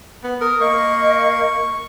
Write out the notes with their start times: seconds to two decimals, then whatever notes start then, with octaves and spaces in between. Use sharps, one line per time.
0.24 B3
0.41 A#4 D#6
0.61 A#3 D#5 C#6